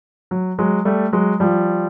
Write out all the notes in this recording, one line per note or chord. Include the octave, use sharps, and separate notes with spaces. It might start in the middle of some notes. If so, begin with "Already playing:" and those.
F#3
F#3 G#3
G3 A3
F#3 G#3
F3 G3